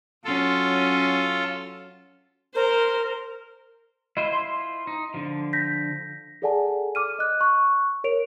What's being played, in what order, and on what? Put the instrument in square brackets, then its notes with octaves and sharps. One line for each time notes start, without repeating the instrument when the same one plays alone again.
[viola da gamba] F#3 C#4 [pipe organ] F4 A4
[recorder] A#4 [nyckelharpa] C5 C6
[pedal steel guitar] E4 F4 C5 [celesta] D#5
[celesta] C6
[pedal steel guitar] D#4
D3 F3
[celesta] G6 A#6 B6
G#4 A4 D5 F#5 G#5 A5
D6 F6 D#7
D#5 F#6
C#6 F#6
A#4 C#5 D7 F7